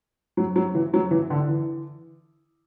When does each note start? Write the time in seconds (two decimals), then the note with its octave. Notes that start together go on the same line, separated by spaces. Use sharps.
0.37 F#3
0.56 F#3
0.75 E3
0.94 F#3
1.11 E3
1.30 D3
1.48 E3